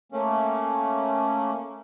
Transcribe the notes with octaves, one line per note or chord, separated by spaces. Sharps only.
A3 A#3 C#4